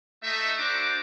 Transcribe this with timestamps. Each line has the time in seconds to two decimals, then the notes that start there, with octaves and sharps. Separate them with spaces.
0.23 A3 D#4 E5
0.58 D4 F#4 A4 C5 A#5 D6